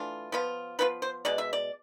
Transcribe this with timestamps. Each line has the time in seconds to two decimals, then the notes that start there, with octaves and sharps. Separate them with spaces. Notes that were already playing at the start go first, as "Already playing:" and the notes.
Already playing: E3 A3 D4 F4
0.32 F3 B3 F4
0.79 F3 B3 F4 B4
1.02 C5
1.25 B2 G#3 D5
1.38 E5
1.53 D5